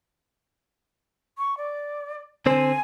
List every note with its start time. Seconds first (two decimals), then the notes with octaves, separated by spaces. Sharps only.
1.38 C#6
1.57 D5
2.46 D3 C4 C5 G#5